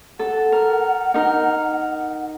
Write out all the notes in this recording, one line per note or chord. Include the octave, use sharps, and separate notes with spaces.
A4 F#5
A#4
D#4 A#4